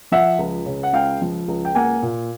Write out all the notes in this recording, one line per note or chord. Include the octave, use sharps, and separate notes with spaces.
F3 E5 F#5
C#2
C#3
F#5
C#2 F5 G5
F3
C#2
G5
A#3 F#5 G#5
A#2